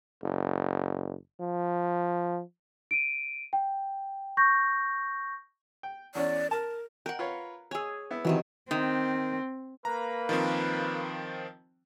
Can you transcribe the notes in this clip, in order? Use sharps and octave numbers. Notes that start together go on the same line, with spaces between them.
F#1
F3
D7 D#7
G5
C#6 G6 A#6
G5
E2 C#4 D5
A#4 A5
A#4 F#5 G5
F4 B4 C#5
G#4 C#5 G#5 E6
B3 E4
C3 D#3 E3 F#3
D#3 C4
A#3 B4 A#5
D#3 F3 C4